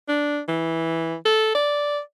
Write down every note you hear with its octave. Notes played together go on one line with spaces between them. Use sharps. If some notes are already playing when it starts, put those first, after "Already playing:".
D4
E3
A4
D5